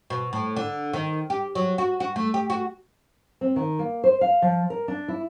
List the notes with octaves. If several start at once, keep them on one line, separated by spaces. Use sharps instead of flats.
B2
A2
D3
D#3
G4
F#3
F#4
F#4
A3
G4
F#4
C4
D#3
A#3
C5
F5
F3
A#4
D4
E4